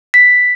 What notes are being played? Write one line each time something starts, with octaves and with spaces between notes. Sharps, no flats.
B6